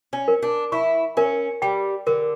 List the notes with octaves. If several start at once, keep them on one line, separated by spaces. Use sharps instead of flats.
C#4
A#4
D4
E4 C#6
C#4 A#4
G3 G5
D3 A#4